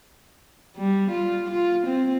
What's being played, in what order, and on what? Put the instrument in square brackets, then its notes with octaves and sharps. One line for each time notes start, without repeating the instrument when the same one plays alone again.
[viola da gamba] G3
F4
F4
C4